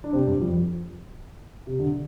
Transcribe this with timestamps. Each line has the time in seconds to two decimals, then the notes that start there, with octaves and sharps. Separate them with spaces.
0.04 D4
0.13 C3 C4
0.27 G2 G3
0.41 F2 F3
1.67 C3
1.80 D3